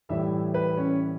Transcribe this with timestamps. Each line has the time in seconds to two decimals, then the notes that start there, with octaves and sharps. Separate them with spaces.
0.09 A2 E3 G3 E5
0.54 B4
0.77 C#4